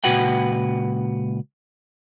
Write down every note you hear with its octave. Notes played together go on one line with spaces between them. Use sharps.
C#2 A#2 F#4 B4 F#5 G5